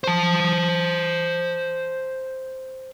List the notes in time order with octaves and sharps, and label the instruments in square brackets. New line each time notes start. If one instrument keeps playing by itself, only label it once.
[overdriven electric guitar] C5 A5